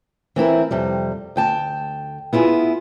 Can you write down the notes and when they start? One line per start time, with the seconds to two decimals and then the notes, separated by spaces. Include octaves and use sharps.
0.36 E3 C4 E4 A#4
0.71 F2 C3 G3
1.36 D2 G5 A5
2.33 B3 E4 F4 G#4